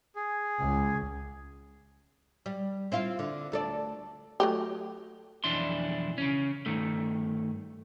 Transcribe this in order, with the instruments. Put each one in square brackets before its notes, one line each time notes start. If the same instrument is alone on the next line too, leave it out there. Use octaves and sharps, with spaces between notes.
[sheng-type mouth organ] G#4
[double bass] C#2
[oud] G3
C4 E4 F4
D3
D2 A4 D5
[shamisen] F#3 A3 G4
[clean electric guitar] B1 F2 E3 D4 E4 C6
C#3 C#4
G2 D#3 A3